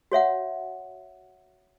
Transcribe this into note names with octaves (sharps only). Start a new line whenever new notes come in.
F#4 C#5 E5 F#5